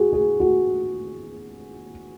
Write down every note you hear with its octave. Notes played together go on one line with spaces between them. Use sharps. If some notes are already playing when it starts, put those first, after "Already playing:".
Already playing: F#4 G#4
G#4
F#4